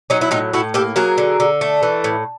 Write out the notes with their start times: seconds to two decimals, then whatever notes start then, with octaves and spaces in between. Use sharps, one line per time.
0.10 F#3 C#4 D#4
0.21 E4
0.31 A2 D#4 F4
0.53 A2 E4 F#4
0.74 A#3 G4 A4
0.96 F#3 G#4 A#4
1.18 D3
1.40 D3
1.61 A3
1.83 E3
2.04 A2